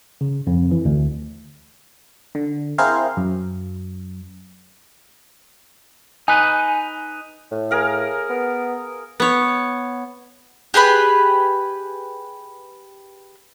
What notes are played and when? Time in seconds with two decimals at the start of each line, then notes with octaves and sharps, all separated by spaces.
0.21 C#3
0.47 F2
0.71 E3
0.85 D2
2.35 D3
2.78 C4 E4 G#4 A#4 C5 F5
3.17 F#2
6.28 D#4 B4 G#5
7.51 A2
7.71 G#4 A#4 F5
8.30 B3
9.20 B3 C#5
10.74 G4 G#4 B4 B5